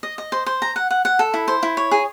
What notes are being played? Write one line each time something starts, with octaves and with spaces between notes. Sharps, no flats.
D#5
D#5
C5
C5
A#5
F#5
F#5
F#5
A4
E4
C5
E4
C#5
G#4